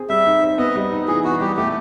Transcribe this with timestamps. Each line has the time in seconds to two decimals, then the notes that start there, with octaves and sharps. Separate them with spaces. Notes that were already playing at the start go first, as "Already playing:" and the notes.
Already playing: C4 G#4
0.09 G3 E5
0.26 D#4
0.42 C4
0.58 B3 D#5
0.76 G3
0.92 D#4
1.08 E3 G#4
1.24 B3 F#4
1.40 G3 G4
1.57 A3 G4